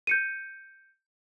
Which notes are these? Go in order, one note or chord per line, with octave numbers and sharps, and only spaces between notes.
G6 C#7 D#7